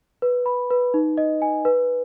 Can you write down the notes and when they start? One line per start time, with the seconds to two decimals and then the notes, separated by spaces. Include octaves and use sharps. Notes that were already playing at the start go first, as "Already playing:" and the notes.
0.22 B4
0.46 B5
0.70 B4
0.94 D#4
1.18 D#5
1.42 G#5
1.65 B4